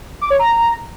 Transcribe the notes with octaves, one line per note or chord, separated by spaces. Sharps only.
D6
C#5
A#5